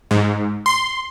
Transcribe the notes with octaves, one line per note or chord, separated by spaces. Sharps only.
G#2
C6